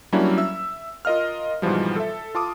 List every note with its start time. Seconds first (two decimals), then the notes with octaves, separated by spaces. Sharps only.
0.13 F#3 G3 A#3 C#4 D4 E4
0.38 E5 E6
1.05 F4 A#4 D#5 F5 F6
1.62 G#2 B2 E3 F3 G3
1.96 A4 E5
2.35 F4 A5 D6 D#6